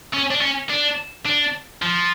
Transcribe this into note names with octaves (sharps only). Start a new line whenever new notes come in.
C#4
D4
C#4
D4
D4
F3